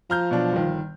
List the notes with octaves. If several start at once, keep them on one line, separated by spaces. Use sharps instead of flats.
F3 A#5 F6 G6
B2 F#3 D4
G1 D#3